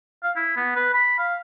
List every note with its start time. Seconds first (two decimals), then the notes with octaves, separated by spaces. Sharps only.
0.23 F5
0.36 E4
0.57 B3
0.76 B4
0.94 B5
1.18 F5